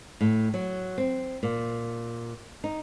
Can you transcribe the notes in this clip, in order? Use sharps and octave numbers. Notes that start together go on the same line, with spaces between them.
A2
F#3
C4
A#2
D#4